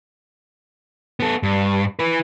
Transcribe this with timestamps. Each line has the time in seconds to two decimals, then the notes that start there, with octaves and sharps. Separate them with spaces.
1.20 B3 A4
1.43 G2
1.99 E4 B4